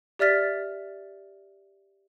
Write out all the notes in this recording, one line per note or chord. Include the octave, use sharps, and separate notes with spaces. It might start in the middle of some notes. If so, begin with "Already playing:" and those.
G4 D5 E5 F6 A6 B6